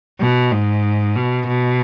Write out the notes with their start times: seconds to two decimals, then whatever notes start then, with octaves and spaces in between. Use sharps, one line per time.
0.20 B2
0.52 G#2
1.16 B2
1.48 B2